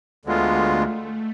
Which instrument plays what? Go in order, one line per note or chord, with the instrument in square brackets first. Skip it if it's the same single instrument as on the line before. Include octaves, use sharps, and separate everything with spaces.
[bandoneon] D2 D3 G#3 B3 F4 [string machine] A3